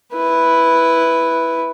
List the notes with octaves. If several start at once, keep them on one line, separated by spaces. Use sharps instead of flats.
E4 B4